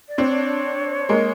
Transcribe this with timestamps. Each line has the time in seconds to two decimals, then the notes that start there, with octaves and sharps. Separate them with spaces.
0.09 D5
0.18 C4 D4 C#5
1.09 G#3 A#3